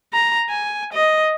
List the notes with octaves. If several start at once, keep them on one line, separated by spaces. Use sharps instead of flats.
A#5
G#5
D#5